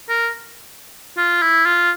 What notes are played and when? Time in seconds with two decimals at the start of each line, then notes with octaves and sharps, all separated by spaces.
0.09 A#4
1.17 F4
1.42 E4
1.66 F4